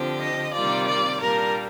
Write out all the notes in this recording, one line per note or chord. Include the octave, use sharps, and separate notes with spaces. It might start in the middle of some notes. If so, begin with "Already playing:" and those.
Already playing: D3 F3 C4 G4
D#5
C3 D#3 G3 A#3 F4 D5
D5
A#2 G3 A#3 D4 A#4